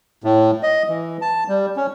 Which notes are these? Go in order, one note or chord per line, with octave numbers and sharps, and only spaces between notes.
A2
D#5
E3
A5
G3
C#4